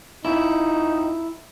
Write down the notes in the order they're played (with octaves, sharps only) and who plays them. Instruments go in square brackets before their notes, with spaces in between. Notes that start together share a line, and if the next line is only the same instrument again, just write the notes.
[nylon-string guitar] F2 [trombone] D#4 [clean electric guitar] E4